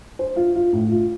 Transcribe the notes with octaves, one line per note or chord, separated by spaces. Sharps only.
C5
F4
F4
A2
F4